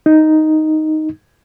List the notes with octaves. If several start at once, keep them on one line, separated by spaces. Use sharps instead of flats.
D#4